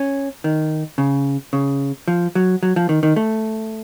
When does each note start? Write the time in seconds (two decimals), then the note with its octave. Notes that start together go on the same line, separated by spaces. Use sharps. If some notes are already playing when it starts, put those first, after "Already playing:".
Already playing: C#4
0.44 D#3
0.98 C#3
1.53 C#3
2.08 F3
2.35 F#3
2.63 F#3
2.76 F3
2.89 D#3
3.03 D#3
3.16 A3